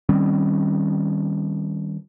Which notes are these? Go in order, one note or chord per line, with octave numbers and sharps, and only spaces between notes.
D#3 G3 C4 C#4